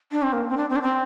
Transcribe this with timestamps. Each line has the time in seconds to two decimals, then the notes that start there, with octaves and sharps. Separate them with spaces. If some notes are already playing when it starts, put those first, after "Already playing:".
0.12 D4
0.23 C4
0.33 A#3
0.49 C4
0.57 D4
0.70 C4
0.76 D4
0.82 C4